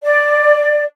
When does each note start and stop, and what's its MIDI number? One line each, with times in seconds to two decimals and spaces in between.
0.04 0.83 74